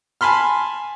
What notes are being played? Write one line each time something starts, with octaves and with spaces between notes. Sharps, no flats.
G#5 A5 B5 C6 F6